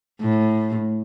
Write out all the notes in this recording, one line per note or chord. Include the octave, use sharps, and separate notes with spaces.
A2